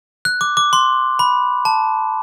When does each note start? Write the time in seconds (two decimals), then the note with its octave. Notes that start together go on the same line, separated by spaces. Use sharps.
0.25 F#6
0.41 D6
0.57 D6
0.73 C6
1.19 B5
1.65 A5